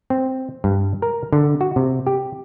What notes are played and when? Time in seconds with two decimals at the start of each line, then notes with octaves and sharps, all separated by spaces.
0.10 C4
0.64 G2
1.02 A#4
1.33 D3
1.61 F#4
1.76 C3
2.07 G4